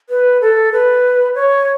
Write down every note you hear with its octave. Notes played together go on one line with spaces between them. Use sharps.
B4
A4
B4
C#5